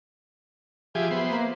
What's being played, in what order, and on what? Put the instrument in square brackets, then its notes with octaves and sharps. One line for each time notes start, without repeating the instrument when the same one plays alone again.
[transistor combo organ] F3 G4 G#4 [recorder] E5
[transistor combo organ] B3 C5
[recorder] A#3